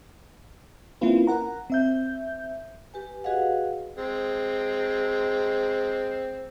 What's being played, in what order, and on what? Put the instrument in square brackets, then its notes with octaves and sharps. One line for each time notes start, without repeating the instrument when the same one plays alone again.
[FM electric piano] A#3 C4 C#4 E4 F4 B4
A#4 F#5 A#5
C4 E5 G6
[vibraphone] G4 B4 G#5
F#4 G#4 B4 D#5 F5 F#5
[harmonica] G#3 C4